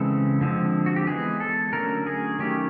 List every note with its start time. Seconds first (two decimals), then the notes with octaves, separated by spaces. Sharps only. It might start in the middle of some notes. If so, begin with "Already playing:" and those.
Already playing: C#3 E3 G#3 C4 A4
0.41 D3 F3 G#3 C4
0.86 F#4
0.96 G4
1.07 E3 G#3 B3 G#4
1.40 A4
1.73 D3 F#3 A3 C#4 A#4
2.06 G#4
2.39 D#3 F#3 A3 C#4 G4